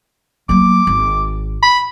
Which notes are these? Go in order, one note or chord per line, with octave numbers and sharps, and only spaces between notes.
F#3 A#3 D6
G#1
B5